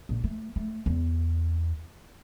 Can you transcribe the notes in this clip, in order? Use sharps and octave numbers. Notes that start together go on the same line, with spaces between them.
A#1
A3
A3
E2